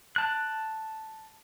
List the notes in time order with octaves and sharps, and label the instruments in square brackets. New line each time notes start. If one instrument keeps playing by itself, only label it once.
[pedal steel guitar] A5 F#6